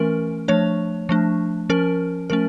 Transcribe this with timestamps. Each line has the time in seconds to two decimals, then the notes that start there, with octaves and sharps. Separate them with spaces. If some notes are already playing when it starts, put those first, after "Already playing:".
Already playing: E3 A3 C#4 A#4
0.48 F3 A3 D4 C#5
1.09 F3 A3 D4
1.70 F3 C#4 A#4
2.30 F3 A3 C#4 A#4